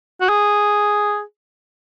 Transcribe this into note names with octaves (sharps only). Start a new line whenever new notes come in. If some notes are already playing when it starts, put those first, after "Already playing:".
F#4
G#4